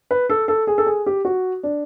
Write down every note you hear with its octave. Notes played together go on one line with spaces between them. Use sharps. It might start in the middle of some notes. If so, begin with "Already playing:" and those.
B4
A4
A4
G#4
A4
G#4
G4
F#4
D4